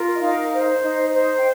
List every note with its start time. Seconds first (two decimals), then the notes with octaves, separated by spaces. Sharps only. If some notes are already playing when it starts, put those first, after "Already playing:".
Already playing: F4 A#4
0.15 D#5
0.21 D#4 F5
0.52 C5
0.83 D#4
1.14 C5
1.38 G5